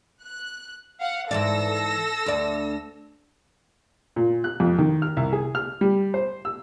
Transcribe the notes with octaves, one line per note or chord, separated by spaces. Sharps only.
F#6
F5 F#5
G#2 E3 A4 D5 E6 A#6
D2 D5
A#2
F#6
F2
D#3
F6
C2
G#4
F6
G3
C5
E6